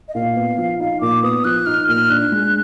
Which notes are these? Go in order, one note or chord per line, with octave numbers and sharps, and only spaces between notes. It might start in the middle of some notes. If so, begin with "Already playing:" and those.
D#5
A#2 F5
B3
F3
D#4 F5
A#2 D6
B3 D#6
F3 F#6
D#4 F6
A#2 F6
D4 F#6
G#3